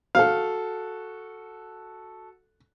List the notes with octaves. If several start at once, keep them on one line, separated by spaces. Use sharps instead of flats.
F#4 A4 F5